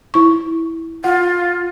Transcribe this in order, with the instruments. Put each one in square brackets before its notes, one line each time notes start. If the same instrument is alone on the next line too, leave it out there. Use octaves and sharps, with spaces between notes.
[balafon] E4 C#6
[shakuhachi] F4 [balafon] F#5